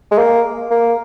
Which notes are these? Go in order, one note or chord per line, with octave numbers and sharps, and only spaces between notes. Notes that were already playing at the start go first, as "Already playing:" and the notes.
G#3
A#3
A#3